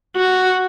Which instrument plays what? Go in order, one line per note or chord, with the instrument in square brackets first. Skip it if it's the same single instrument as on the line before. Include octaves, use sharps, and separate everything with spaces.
[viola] F#4